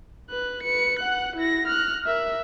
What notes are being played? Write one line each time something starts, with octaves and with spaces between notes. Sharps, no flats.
B4 F#6
B4 C#7
F#5 F#6
E4 A#6
F6 F#6
A#4 E5